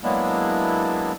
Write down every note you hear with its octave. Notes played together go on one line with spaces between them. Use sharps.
F#3 G#3 A#3 B3 D4 E4